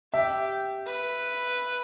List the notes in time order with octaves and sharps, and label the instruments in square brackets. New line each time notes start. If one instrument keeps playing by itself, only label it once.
[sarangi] G4 [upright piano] E5
[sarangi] B4